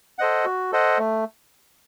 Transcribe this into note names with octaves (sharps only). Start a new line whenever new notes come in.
A4 C5 D#5 F#5
F#4
A4 C5 D#5 F#5
A3